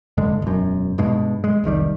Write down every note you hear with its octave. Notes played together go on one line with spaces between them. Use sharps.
F1 G2 D3 G#3
E1 F#2
G2 B2 G#3
G#3
F1 C2 D#3 G3